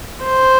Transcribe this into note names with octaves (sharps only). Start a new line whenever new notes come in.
C5